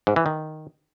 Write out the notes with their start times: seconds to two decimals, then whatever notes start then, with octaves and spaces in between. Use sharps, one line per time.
0.07 G#2
0.16 E3
0.26 D#3